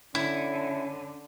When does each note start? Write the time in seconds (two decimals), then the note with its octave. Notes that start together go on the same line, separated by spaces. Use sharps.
0.15 D3 C#4 E4